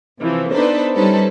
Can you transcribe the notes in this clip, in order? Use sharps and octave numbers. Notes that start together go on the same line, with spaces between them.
C3 E3 F3
B3 D4 D#4 A4 B4 C5
G3 C#4 D#4 A4 B4 C5